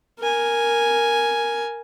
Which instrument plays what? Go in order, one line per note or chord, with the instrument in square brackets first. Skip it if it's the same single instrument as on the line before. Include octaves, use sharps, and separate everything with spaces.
[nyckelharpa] A#4 G#5